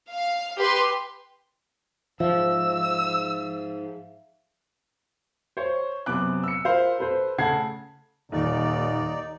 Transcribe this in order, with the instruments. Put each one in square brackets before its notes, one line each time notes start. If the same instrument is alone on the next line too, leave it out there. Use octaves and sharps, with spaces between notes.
[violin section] F5
G4 B4 C6
[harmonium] G#2 [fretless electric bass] F3 [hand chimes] E5 F5 [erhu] E6
[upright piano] C5 C#5
F#2 C3 B3 D6 F#6
E6 C#7
F4 A#4 C5 F5 B5
A4 B4 C5
C#3 A3 F#5 A5 G#6 C7
[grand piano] D#1 [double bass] D#2 [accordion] D#4 D5